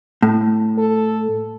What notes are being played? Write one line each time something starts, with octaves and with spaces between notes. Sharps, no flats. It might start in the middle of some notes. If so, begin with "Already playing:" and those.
A2
A4